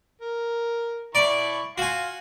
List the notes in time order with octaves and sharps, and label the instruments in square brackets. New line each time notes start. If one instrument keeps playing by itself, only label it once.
[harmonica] A#4
[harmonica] E4 B5 C#6 [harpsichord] D5
[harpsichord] F#4 G#5 [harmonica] F5 C6